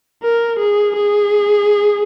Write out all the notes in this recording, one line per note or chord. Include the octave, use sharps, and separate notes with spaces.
A#4
G#4
G#4